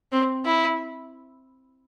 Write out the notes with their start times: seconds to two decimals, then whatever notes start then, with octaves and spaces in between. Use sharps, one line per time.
0.12 C4
0.45 E4